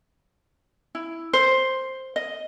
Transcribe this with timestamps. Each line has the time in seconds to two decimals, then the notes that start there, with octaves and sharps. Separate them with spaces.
0.95 E4
1.33 C5
2.16 D#5